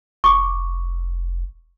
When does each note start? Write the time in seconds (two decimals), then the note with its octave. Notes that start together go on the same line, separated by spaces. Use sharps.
0.24 F1 C#6 D6